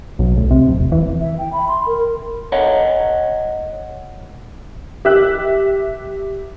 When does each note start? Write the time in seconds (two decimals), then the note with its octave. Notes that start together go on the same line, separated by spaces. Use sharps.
0.19 B1
0.37 D2
0.51 C3
0.67 D1
0.79 F1
0.92 E3
1.19 E5
1.38 G5
1.53 B5
1.68 C6
1.86 A#4
2.52 C#5 D#5 F#5
5.05 G4 E5 F#6